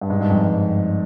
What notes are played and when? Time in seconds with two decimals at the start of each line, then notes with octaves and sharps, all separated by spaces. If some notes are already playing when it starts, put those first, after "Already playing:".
0.01 G2
0.10 G#2
0.20 G2
0.30 F2
0.40 G2